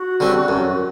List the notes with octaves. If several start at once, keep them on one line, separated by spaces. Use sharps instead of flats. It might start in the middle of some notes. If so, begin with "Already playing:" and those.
Already playing: F#4
D3 G3 C4
F#2